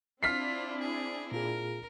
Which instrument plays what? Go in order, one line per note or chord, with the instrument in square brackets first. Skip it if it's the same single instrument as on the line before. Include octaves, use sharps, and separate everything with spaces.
[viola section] C4 D4 E4 [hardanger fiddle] F4 [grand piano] F6 B6 C7
[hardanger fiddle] G#4
[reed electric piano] A#2 F4 G#4 [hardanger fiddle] A#4